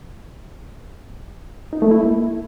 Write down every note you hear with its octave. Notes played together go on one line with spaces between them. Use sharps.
D#4
A3
E4
A#3